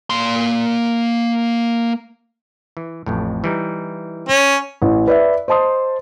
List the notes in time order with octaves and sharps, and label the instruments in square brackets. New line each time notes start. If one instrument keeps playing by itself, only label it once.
[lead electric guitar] A#3 C6
[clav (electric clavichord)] E3
A1 F2 A2
E3 G3 D#4
[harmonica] C#4
[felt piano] A1
B4 D5 E5
C5 D#5 A5 C6 D#6